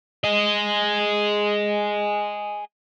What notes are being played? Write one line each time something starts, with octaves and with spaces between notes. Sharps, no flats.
G#4 D#5